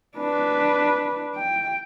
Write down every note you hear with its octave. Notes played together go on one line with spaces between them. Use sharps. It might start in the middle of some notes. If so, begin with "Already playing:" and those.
D4 B4
G5